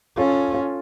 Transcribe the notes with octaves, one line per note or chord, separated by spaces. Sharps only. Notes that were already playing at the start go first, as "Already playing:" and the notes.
C#4 F4 A4
F4